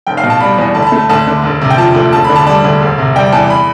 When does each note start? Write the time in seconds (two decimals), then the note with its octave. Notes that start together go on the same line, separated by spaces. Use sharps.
0.07 F1 G5
0.17 F5
0.23 B2
0.30 A5
0.40 G3 B5
0.58 E2
0.75 D2 A5
0.82 B5
0.87 A5
0.92 A3
0.97 A5
1.10 D2 A5
1.27 D3
1.43 E1
1.61 C3
1.70 G5
1.77 F3 A5
1.95 D2
2.12 E1 A5
2.24 D3 B5
2.35 A5
2.47 G3 A5
2.64 D2
2.81 E1
2.98 C3
3.16 G3 G5
3.32 E2 A5
3.50 B5